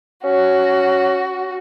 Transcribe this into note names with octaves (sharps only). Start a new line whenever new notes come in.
C#4 F#4